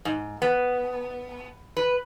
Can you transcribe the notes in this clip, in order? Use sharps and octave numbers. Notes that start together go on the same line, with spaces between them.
G#2
B3
B4